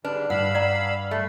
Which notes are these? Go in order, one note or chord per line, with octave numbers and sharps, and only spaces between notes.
G#2 D3 G3 D4 B4
G2 F5 F#5 B5 E6
D5 F#5 A#5
A3